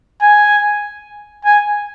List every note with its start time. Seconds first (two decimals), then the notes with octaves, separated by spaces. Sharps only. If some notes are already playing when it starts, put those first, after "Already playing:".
0.22 G#5
1.45 G#5